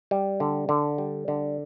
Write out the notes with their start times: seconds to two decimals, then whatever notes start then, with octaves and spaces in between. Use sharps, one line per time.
0.11 G3
0.40 D3
0.69 D3
0.98 G3
1.28 D3